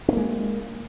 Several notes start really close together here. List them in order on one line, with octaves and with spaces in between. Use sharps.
C#4 A#3 G#3